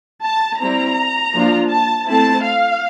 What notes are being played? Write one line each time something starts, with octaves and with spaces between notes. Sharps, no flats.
A5
G3 C4 E4 A#5
F3 A#3 D4 F4
A5
A3 C4 E4 A5
F5